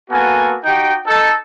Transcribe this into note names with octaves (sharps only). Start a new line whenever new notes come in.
A#3 B3 F#4 A4 G#5
D#4 F#4 G4 G5
D#4 A4